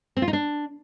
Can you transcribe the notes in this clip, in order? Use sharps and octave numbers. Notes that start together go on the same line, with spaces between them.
C4
F4
D#4
D4